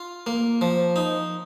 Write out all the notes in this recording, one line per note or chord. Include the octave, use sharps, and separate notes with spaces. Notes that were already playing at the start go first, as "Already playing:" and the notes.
Already playing: F4
A#3
F3
D#4